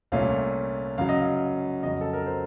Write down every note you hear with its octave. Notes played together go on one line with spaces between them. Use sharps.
C2 A#2 A3 C#4 F5
F#2 C#3 F#3 F5
D#5
F5
F2 C#3 F#3 D#5
A4
A#4
C5